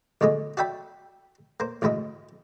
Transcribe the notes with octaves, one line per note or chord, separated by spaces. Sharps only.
B1 A2 D3 G#3 D#5
F#4 D5 E5 G5 B5
A#3 C5
A1 D2 G#2 E4 D#5